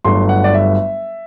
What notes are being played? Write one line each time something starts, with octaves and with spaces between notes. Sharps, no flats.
G1 G2 F#3 A3 C6
F#5
D5
E5